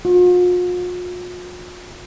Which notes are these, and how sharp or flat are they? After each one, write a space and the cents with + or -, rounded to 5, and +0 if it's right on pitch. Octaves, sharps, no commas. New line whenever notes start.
F4 +45